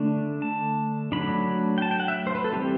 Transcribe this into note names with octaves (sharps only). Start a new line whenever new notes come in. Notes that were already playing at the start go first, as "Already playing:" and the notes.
Already playing: D3 A3 D4
A5
F#3 A3 D4 B5
G5
A5
G5
F#5
E5
C5
B4
A4
E3 G3 C4 G4